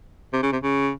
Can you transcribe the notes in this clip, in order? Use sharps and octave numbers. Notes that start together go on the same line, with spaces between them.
C3
C#3
C3
C#3